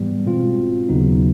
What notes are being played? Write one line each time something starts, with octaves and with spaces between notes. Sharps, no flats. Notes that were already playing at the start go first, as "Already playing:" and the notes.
Already playing: G#2 E3 G3 B3
B2 G#3 C4 F4
D#2 C#3 F#3 B3 D#4